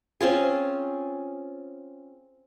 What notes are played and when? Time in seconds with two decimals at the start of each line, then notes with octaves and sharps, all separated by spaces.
0.21 C4 C#4 F4 G#4